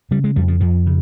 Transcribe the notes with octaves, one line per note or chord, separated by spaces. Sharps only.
C#3 G3
G#3
F2 G3
F3
F2 F3
C#3